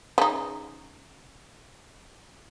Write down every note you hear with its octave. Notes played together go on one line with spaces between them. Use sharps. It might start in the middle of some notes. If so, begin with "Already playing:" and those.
C#3 D#4